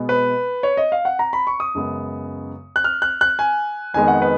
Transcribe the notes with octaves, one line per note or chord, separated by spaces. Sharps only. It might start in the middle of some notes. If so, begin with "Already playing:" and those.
Already playing: B2 G#3 B3
B4
C#5
D#5
F5
F#5
A#5
B5
C#6
D#6
F#2 C#3 G#3 B3
F#6
F6
F#6
F#6
G#5
F2 D#3 G#3 B3 G#5
F#5
B4